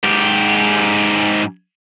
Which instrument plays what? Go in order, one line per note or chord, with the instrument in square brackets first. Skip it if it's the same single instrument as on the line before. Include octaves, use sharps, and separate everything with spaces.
[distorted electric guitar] G#2 G4